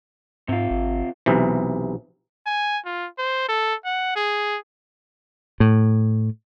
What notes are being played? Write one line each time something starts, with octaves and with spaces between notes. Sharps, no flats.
G#2 C3 F4
G#1
B1 C3 E3
G#5
F4
C5
A4
F#5
G#4
A2